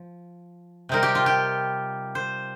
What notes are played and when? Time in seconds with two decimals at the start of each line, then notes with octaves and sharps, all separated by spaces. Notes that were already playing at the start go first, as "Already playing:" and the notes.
Already playing: F3
0.89 C3 G3 C4 D#4 A#4
1.03 G4
1.15 F4
1.26 G4
2.15 C5